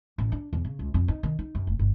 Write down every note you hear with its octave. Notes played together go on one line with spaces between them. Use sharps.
A1
D4
E2
C#3
C#2
F2
D#4
D#3
D#4
F#2
F1
G1